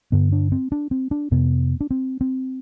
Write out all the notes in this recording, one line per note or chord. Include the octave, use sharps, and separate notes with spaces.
G2 D3 B3
D4
C4
D4
C4
D4
F2 C3 B3
D4
C4
C4